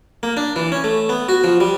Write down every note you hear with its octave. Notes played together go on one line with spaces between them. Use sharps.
A#3
D4
E3
C#4
A3
B3
F#4
F3
G3